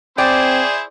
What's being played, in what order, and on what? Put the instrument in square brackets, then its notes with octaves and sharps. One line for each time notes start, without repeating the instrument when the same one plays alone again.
[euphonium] C4 [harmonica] E4 G#4 C5 [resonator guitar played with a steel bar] D5 [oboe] G5